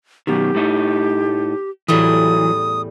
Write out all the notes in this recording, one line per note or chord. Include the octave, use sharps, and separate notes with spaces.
F#2 B2 D#3 G4
A2 A3 D#4
E2 A2 E3 F#3 G3 D#6